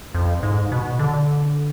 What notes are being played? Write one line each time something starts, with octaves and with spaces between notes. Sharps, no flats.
F2
G#2
B2
D3